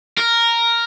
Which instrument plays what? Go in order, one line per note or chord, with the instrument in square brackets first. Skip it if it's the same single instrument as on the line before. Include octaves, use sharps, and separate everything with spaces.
[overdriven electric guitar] A#4